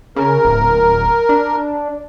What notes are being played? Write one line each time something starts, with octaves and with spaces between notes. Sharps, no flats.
C#3 A#4
D1
D4